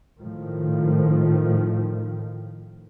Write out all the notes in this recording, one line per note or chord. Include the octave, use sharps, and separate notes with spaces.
A2 D#3 F3